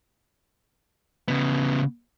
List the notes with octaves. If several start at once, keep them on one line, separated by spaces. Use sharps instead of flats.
C#3 B3